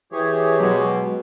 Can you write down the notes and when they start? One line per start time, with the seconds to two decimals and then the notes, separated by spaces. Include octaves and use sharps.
0.12 E3 G4 G#4 C#5
0.60 B2 F#3 G#3